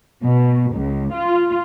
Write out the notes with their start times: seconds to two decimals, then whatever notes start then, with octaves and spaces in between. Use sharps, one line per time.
0.23 B2
0.73 C#2
1.12 F4